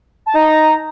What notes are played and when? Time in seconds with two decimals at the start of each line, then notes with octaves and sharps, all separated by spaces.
0.26 A5
0.35 D#4 A#5